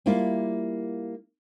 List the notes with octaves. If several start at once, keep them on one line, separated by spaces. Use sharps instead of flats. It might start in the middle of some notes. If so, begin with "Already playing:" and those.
G3 A#3 E4 F4